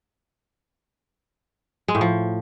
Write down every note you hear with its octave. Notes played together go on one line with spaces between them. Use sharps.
G#3
A2
F3